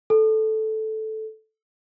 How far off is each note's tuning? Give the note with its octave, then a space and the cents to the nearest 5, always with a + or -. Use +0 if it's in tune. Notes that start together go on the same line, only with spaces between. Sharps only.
A4 -10